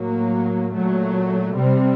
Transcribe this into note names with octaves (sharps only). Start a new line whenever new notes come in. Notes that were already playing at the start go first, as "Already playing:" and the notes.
Already playing: A2 F#3 A#3
A#2 F#3 A3
C3 G3 C4